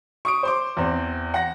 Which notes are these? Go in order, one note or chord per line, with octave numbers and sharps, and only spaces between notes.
C#6 D#6 D7
C5 C6 D6
E2 C4
F#5 A#6